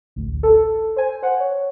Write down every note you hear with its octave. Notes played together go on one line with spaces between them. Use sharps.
A1 D2
A4
C5 G#5
C5 F#5
C#5